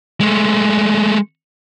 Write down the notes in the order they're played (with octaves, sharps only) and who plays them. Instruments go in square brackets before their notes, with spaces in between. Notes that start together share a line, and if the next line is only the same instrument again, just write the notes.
[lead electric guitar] G#3 A3